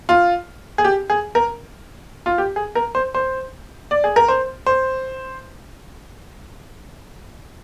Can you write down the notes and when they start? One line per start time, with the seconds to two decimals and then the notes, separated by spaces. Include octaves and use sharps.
0.09 F4
0.78 G#4
0.84 G4
1.10 G#4
1.35 A#4
2.26 F4
2.38 G4
2.56 G#4
2.75 A#4
2.95 C5
3.15 C5
3.91 D5
4.04 G#4
4.16 A#4
4.29 C5
4.67 C5